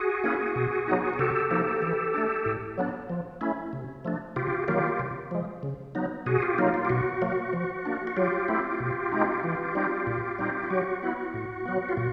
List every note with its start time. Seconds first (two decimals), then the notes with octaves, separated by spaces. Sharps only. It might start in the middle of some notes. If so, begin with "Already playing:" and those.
Already playing: F#4 G#4
0.24 A#3 C#4 E4
0.56 B2
0.88 F#3 B3 D#4
1.14 G#4
1.19 C3 G4 A4
1.51 F3 A#3 D#4
1.82 E3
2.14 A3 D4
2.46 A2
2.78 F#3 B3 D4
3.10 F3
3.41 A3 C#4 E4
3.73 C3
4.05 F3 A3 D4
4.36 C3 F4 G4
4.68 D#3 F#3 A#3 F4 G4
4.99 C3
5.31 F3 G#3
5.63 C#3
5.95 F#3 B3 D#4
6.26 B2 F#4 G#4
6.42 F4 G4
6.58 F#3 A#3 D#4 F4
6.74 F4
6.85 G4
6.90 B2 F#4
7.22 F#3 A#3
7.53 F3
7.85 A#3 D4
8.07 F#4
8.17 F#3 F4 G4
8.48 A3 C4 E4
8.80 B2
9.12 G#3 C4 D#4
9.44 E3
9.75 G3 C4 D#4
10.07 A#2
10.39 G3 C4 D#4
10.63 F4
10.70 F#3 F#4
11.02 B3 E4
11.34 A2
11.65 F#3 B3
11.89 F4
11.97 A#2 F#4